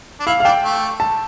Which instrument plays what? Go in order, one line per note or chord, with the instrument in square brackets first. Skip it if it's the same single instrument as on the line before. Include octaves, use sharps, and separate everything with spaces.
[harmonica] D4
[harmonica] E4 [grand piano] F5
[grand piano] F5
[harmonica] D4 [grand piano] G5
[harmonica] A3
[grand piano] A5